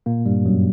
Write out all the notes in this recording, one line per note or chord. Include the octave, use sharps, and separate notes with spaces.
A#2 A#3
G2 G3
F#2 F#3